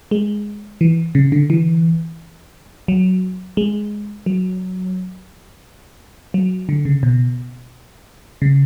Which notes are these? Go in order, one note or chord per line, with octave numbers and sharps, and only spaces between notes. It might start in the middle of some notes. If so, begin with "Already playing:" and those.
G#3
E3
C#3
D3
E3
F#3
G#3
F#3
F#3
D3
C#3
B2
C#3